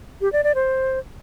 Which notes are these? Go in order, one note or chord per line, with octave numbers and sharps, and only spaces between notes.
G4
D5
D5
C5